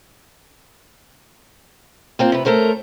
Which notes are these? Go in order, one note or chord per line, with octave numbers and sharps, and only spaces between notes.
A#3 C4 F4
C3 B4
A3 A4 A#4 C5 C#5